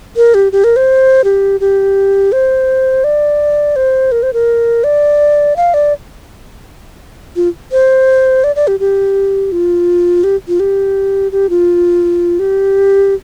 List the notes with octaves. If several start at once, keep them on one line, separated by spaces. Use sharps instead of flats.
A#4
G4
G4
A#4
C5
G4
G4
C5
D5
C5
A#4
C5
A#4
D5
F5
D5
F4
C5
D5
D5
G4
G4
F4
G4
F4
G4
G4
F4
G4